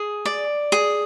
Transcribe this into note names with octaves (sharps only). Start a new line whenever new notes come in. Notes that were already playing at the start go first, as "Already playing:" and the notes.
Already playing: G#4
D5
G#4